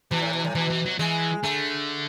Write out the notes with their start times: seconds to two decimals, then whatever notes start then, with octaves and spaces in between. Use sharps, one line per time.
0.11 B2 E3
0.22 A2
0.33 B2
0.44 A2
0.55 B2 E3
0.70 E3
0.85 F#3
0.99 E3 G#3
1.43 D3 A3